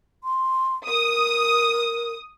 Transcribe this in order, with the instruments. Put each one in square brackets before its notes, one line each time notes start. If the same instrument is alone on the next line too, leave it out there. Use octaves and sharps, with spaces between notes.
[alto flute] C6
[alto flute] A#4 [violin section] D#6